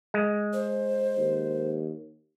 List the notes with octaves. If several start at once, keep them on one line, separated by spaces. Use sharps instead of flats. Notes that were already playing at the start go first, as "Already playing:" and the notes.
G#3
C5
D#2